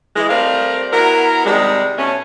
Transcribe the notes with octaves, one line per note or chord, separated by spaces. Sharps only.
E3 G#3
G3 A3 C4 A#4 D5 F5
F#3 B3 E4 A#4
C3 D#3 G3 G#3
B2 A3 C#4